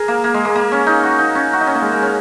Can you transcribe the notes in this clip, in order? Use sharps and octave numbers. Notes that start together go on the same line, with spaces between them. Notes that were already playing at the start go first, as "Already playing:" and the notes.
Already playing: G#4 A#4
A#3
A#3
G#3
A#3
A#3
C#4
D#4
F#4
D#4
C#4
F#4
D#4
C#4
A#3
G#3
A#3
C#4